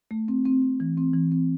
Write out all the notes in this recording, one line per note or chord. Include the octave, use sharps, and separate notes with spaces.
A3
C4
C4
C4
E3
C4
E3
C4